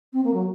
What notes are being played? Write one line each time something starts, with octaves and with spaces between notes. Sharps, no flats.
C4
A#3
F#3